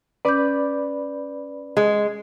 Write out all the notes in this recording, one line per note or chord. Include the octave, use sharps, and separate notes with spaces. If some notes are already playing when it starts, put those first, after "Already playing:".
C#4 B4 D5 B5 D6 G6
G#3